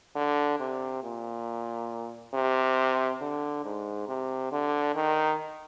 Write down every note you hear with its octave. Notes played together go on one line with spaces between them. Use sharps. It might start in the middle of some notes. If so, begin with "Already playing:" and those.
D3
C3
A#2
C3
D3
G#2
C3
D3
D#3